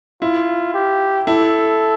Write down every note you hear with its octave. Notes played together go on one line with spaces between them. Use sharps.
E4 F4
G4
E4 A4